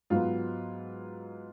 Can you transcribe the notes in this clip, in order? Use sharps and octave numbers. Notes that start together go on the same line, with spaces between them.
G#2 F#3 B3 F4